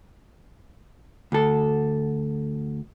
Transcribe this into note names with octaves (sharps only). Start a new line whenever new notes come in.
D2 A4